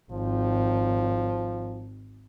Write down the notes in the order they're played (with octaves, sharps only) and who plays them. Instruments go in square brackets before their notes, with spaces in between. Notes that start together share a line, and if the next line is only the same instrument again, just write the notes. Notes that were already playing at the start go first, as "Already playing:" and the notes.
[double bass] G#1 [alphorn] F3